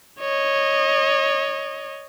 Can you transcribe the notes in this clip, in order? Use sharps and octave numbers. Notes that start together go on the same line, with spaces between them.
C#5 D#5